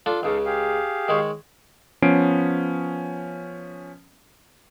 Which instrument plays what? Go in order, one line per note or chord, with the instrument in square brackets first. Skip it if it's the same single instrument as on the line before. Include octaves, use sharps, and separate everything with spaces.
[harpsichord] D4 F4 A4
[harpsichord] C#2 C#3 [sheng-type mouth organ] D#4 A4 F5
[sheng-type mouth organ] G4 G#4 F5
[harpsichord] D#3 G#3 C#5
[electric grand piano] F3 B3 C#4 C7 D7